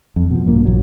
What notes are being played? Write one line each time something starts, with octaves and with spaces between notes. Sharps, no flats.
F2
B2 F3
A#1 G2 A#3
A#1 E3 F#3